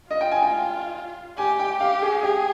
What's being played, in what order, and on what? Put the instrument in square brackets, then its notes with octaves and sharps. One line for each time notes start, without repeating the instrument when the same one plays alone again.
[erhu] F4 [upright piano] D#5
[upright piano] G5
G#5
G5
[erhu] G4 [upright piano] G#5
[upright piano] G5
[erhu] G4 [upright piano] F5
[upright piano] G#4
[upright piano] G4 [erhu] G#4